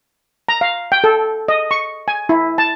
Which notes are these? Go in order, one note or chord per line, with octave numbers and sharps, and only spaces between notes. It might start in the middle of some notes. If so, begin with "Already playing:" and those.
A#5
F5
G5
A4
D#5
C#6
G#5
E4
A5